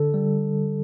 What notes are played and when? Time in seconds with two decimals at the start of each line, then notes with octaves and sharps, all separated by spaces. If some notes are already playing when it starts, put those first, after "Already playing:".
Already playing: D3 A4
0.14 G3